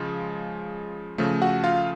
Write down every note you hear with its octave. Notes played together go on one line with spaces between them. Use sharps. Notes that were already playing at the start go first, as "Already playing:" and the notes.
Already playing: C#3 F3 G#3
C#3 F3 A3
F#4 F#5
F4 F5